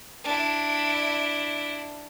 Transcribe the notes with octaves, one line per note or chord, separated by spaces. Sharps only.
D4 E4